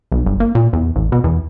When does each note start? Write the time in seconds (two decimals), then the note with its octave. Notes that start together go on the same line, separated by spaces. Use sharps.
0.12 B1
0.26 G1
0.40 A#3
0.55 A#2
0.73 E2
0.96 A1
1.12 B2
1.24 E2